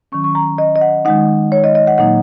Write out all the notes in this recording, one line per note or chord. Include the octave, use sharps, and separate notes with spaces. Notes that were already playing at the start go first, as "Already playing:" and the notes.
D#3 F#3 C#4 C#6
C#6
A#5
D#5
D#5
F#5
D#3 G#3 D#4 F#5
C#5
D#5
D#5
F#5
A#2 F#3 A#3 D#4 F#5